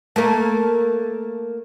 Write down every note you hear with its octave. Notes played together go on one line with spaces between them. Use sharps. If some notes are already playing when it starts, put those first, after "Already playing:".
A3 A#3 A#4